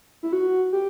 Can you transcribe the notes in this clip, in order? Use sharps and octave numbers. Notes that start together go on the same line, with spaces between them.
E4
F#4
G4